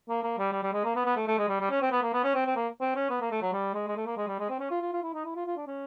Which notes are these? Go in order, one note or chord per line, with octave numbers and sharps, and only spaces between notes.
A#3
A#3
G3
G3
G3
G#3
A#3
B3
B3
A3
A3
G#3
G3
G3
C#4
C4
B3
A#3
B3
C#4
C4
C4
A#3
C4
C#4
B3
A#3
A3
F#3
G3
G#3
G#3
A3
A#3
G#3
G3
G#3
C4
C#4
F4
F4
F4
E4
D#4
E4
F4
F4
D4
C#4